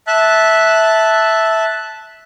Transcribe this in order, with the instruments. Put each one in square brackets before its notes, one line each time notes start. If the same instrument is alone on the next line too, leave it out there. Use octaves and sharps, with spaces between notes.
[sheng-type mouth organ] E5 A5 F#6